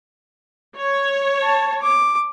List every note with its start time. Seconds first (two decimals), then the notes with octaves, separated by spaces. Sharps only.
0.77 C#5
1.42 A5
1.82 D6